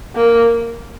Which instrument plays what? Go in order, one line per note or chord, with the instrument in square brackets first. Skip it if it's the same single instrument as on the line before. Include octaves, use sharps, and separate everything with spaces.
[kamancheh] A#3